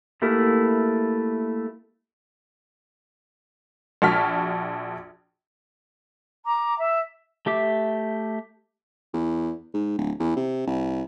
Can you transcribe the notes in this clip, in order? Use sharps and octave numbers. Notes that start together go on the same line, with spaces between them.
A3 A#3 E4 G4 A#4
A#1 F#4 A5 F6 B6
A#5 D6
E5
A3 G4 E5 D6
E2
G#2
D1
E2
C3
C2